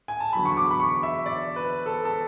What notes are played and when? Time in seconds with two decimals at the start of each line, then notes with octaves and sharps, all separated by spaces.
0.08 G#5
0.20 A5
0.33 E2 D3 F#3 B5
0.45 C#6
0.57 D6
0.71 B5
0.80 C#6
1.03 E5
1.26 D5
1.56 B4
1.86 A4
2.05 A4